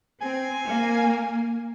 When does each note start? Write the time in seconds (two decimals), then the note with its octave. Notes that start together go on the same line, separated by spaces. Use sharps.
0.21 C4 G#5
0.67 A#3